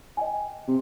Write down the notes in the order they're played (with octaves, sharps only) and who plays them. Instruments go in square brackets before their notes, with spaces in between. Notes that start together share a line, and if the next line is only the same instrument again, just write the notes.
[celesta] D#5 G5 G#5
[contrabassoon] C3